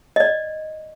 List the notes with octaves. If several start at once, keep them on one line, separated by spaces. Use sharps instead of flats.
D5 D#5